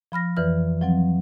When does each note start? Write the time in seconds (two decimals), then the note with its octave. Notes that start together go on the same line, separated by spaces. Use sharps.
0.12 F3 B5 F6 A#6
0.37 F2 E3 B4 D5 F6
0.81 F3 F#3 C4